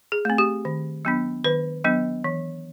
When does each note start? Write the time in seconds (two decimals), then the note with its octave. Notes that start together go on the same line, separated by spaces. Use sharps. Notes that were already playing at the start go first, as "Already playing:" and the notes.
0.12 G#4
0.25 A3 C4
0.38 G4
0.65 D#3
1.05 F#3 B3 D4
1.44 D#3 B4
1.84 F#3 B3 D4
2.24 E3